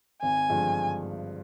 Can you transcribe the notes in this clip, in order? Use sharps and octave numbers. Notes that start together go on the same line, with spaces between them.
G#1 G#5
G2 D3 F3 G#3